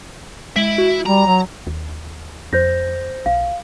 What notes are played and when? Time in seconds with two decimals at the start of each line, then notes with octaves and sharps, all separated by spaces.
0.56 G#3 E4 E5 D7 F#7
0.78 F#4
1.06 G3 A#5
1.26 F#3
1.67 D#2
2.53 F2 C5 G6 A#6
3.26 B1 F5